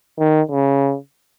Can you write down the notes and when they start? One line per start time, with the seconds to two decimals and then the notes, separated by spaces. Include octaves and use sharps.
0.19 D#3
0.51 C#3